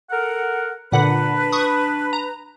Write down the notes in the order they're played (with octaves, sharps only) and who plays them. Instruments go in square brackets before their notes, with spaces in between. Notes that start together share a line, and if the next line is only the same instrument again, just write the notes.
[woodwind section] A4 A#4 F#5
[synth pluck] A#2 D3 F#5 [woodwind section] D4 B4
[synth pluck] C#6 D#6
A#5